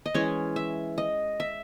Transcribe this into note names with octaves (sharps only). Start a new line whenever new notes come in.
D#5
E3 G#3 C#4 C#5
E5
D#5
E5